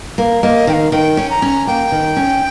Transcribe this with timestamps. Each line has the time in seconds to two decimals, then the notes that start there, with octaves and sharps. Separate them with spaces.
0.18 A#3
0.43 A#3 D#5
0.67 D#3 G5
0.73 F5
0.92 D#3 G5
1.17 C#4
1.30 A#5
1.42 C#4
1.67 A#3 G5
1.92 D#3
2.17 C#4